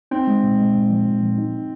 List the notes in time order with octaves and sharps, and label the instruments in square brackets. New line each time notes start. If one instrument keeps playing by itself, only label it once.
[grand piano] C4 [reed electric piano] D#4
[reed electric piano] G#3
A#2
G#3
A#2
F3
A#2
F3
D#4
D#4